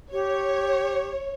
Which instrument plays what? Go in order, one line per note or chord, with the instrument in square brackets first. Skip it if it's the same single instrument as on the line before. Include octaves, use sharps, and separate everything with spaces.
[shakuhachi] G4 [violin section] C#5